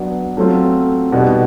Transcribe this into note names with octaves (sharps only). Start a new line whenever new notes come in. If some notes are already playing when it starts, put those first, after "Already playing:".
Already playing: F#3 B3 D4
F#3 A3 C4 F4
B2 G3 B3 D#4 G4